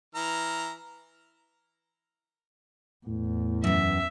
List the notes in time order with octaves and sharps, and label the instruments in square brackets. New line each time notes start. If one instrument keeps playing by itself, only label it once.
[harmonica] E3 A#5 F6
[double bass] E2 [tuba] A2
[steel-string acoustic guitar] F#2 E3 [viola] E5